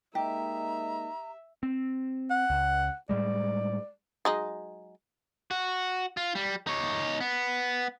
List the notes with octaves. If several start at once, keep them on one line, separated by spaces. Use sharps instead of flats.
G#3 A#3 D#4 G4 E5 A#5
C4
F#5
C#2
A2 G3 G#3 D5
F#3 G#3 D#4
F#4
F4
G3
D#4 C#5
B3